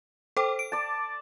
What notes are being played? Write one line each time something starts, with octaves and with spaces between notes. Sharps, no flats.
A4 C5 G5 D6
D7
D5 A5